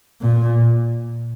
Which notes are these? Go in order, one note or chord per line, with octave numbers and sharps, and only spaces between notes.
A#2